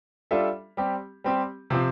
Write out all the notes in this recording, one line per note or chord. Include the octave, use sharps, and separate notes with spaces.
G3 D4 F4 A4 E5
G3 C4 G4
G3 C4 G4
C3 F3 C4